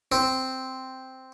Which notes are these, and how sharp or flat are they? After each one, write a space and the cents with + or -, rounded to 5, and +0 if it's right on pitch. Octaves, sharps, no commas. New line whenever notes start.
C4 -5